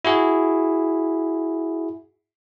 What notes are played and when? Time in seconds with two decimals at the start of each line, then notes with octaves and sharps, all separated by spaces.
0.05 E4 F#4 G#4